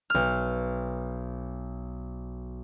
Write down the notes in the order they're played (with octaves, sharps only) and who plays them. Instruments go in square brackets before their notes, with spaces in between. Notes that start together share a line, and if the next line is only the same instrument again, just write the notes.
[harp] B1 F6